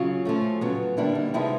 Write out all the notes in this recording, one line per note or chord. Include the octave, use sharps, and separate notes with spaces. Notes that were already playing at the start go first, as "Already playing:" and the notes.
Already playing: C#3 F#3 F4
F3 A3 C#4
C#3 F#3 B3
D3 G3 A#3 D4 E4
D#4
C3 F3 G#3 B3 D#4 E4